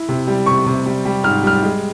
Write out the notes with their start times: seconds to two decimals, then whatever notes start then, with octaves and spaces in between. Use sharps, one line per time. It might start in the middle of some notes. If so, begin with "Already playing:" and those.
Already playing: E4
0.09 C3
0.27 G3
0.46 C3 C#6
0.66 C3
0.86 G3
1.05 G3
1.24 G#2 F6
1.43 G3 F6
1.63 G#3